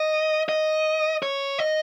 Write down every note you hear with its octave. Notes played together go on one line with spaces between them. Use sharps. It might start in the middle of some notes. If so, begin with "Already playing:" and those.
Already playing: D#5
D#5
C#5
D#5